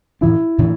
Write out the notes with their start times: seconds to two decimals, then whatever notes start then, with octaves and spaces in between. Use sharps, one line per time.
0.21 A2 E3 D4 E4
0.58 A2 E3 D4